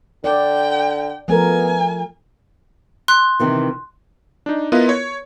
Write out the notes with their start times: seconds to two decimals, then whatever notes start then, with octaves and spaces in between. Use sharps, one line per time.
0.24 D3 D5 G5
1.28 F3 A3 B3 A#4 G#5
3.08 C6 F#6
3.40 C3 D#3 E3
4.46 D4 D#4
4.72 B3 E4 F4 A#4 B4 D#5
4.89 C#5